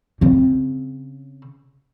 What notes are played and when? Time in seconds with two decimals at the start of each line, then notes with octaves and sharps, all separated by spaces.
0.21 C#3 C4